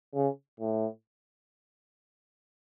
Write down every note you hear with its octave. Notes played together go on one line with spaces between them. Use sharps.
C#3
A2